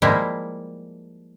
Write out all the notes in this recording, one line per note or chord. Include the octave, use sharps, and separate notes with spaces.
F3 G3 G#3 A#3 E4